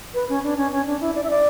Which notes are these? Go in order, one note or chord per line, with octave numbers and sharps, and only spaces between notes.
B4
C#4
D4
C#4
C#4
D4
E4
D5
E5
D5